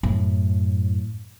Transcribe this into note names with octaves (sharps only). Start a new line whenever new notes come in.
F#2 A2